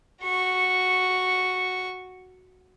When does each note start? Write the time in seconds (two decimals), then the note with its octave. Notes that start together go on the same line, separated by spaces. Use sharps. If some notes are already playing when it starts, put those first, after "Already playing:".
0.23 F#4 C#6